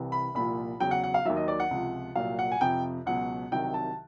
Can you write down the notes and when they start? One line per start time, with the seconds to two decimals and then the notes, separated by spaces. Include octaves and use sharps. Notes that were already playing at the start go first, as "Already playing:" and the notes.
Already playing: C2 C3 E3
0.12 B5
0.35 C2 A#2 F3 B5
0.80 E2 C#3 F#3 G5
0.91 F#5
1.04 F#5
1.14 F5
1.25 D#2 D#3 F#3 E5
1.36 D#5
1.48 D5
1.60 F#5
1.71 C#2 C3 F3
2.16 C2 A#2 F#3 F5
2.39 F#5
2.52 G#5
2.61 F2 C3 F3 G5
3.06 C#2 B2 F#3 F#5
3.51 C2 C3 D#3 F#3 G5
3.74 A5